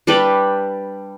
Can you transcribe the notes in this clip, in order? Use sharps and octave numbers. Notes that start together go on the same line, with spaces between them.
G3 D4 G4 B4